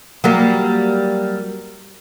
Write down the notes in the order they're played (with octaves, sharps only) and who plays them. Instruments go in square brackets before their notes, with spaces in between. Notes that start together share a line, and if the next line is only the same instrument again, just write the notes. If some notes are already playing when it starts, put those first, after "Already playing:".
[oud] F#3 G3 A#3